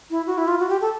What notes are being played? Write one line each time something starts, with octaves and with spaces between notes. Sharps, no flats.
E4
F#4
E4
F4
F#4
G4
A4